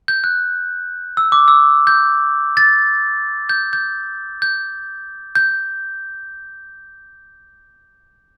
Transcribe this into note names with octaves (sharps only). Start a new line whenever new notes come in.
G6
F#6
E6
D6
E6
G6
A6
G6
G6
G6
G6